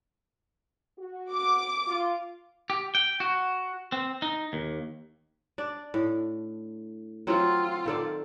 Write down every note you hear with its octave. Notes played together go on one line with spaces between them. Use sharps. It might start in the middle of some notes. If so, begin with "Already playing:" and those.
F#4
D6
F4
G4
G5
F#4
C4
D#4
D#2
D4 D5
A2
F#3 C4 F4
D#3 A4 D5